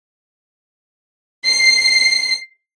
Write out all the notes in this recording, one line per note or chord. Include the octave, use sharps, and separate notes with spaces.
C7